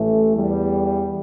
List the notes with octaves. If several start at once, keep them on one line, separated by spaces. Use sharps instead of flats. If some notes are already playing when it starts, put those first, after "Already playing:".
Already playing: A1 A2 E3 A3
E2 E3 G3